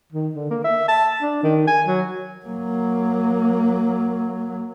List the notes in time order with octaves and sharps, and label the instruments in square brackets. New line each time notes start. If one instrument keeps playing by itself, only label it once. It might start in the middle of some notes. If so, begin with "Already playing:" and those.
[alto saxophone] D#3
D3
A#3
E5
A5
D4
D#3
G#5
F#3
[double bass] F#3 A#3